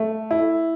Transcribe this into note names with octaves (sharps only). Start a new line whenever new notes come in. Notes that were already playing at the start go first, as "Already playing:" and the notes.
Already playing: A3
E4